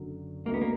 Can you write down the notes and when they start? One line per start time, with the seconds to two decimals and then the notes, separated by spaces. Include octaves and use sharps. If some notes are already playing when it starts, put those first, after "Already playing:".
Already playing: F#1 F#2 D3 F#3
0.45 D2 D3 G#3 A#3
0.54 B3
0.62 A#3